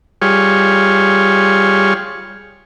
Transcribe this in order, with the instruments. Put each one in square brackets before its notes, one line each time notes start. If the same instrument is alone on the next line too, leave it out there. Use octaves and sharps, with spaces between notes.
[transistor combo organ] G3 F4 G#4 C#5